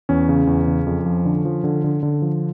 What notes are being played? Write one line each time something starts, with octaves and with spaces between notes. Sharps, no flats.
E2 C#4
C#3
E2
C#3
F2
F3
D3
F3
D3
D3
D3
F3